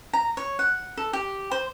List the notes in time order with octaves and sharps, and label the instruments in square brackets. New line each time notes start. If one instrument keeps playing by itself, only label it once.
[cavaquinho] A#5
C#5
F#5
A4
G4
C5